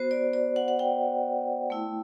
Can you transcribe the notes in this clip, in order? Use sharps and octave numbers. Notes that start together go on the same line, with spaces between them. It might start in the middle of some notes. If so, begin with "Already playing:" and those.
Already playing: B3 F#4 C5
D5
D5
F#5
F#5
G5
A3 E4